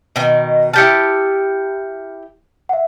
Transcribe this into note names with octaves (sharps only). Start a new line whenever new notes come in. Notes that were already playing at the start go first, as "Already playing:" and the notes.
B2 D#3
E4 G4 A5 F6 G6 C#7
E5 F#5